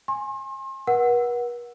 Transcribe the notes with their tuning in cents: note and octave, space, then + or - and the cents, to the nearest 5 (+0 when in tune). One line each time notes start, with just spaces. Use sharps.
G#5 +0 C6 +40
B4 -45 F#5 +0